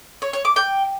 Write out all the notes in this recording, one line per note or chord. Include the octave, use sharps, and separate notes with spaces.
C#5
C#5
D6
G5